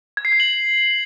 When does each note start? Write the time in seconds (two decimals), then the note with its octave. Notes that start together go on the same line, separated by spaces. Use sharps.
0.17 G#6
0.25 C7
0.32 G#6
0.40 F#7